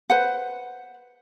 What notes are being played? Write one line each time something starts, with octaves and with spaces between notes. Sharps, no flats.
B4 C5 F#5